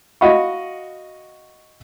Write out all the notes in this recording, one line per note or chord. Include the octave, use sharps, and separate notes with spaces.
F#4 D#5 F5 F#5 B5 C#6